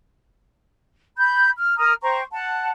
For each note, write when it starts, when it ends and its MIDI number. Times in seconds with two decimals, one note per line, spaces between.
1.18 1.50 83
1.18 1.50 91
1.57 1.77 89
1.78 1.94 70
1.78 1.94 82
1.78 1.94 87
1.78 1.94 89
2.03 2.21 72
2.03 2.21 79
2.03 2.21 82
2.03 2.21 85
2.31 2.70 78
2.31 2.70 81